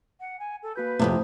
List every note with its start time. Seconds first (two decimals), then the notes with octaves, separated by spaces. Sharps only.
0.20 F#5
0.39 G#5
0.62 A4
0.76 A#3 F#4 B4 G6
0.99 F2 A2 C3 A3 C5 D#6